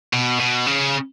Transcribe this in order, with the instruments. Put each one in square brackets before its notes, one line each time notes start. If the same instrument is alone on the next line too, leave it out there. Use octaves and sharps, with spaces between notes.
[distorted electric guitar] B2
B2
C#3